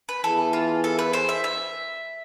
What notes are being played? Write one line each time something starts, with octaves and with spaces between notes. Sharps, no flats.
B4
E3 B3 E4 G#4 A4
F4
A4
B4
C5
E5
E5